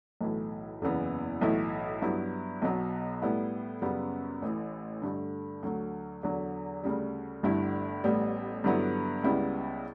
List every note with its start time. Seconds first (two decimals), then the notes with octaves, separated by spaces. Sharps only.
0.21 B1 A2 E3 A3
0.82 F#1 E2 C#3 E3 B3
1.41 B1 A2 E3 A3 E4
2.02 G2 F#3 B3 E4
2.62 B1 B2 F#3
3.22 A2 G3 B3 E4
3.82 F#2 C#3 G3 B3
4.42 A1 A2 E3
5.02 G2 D3 A3
5.63 D2 D3 F#3
6.23 E2 D3 F#3
6.83 D2 C#3 G3
7.43 G1 G2 D3 A3 E4
8.04 A1 A2 G3 B3
8.64 G2 D3 F#3 B3 E4
9.23 C#2 C#3 G3 B3 E4